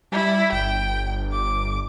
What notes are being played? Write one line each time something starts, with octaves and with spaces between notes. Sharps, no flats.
G3 E4
G1 G5
D6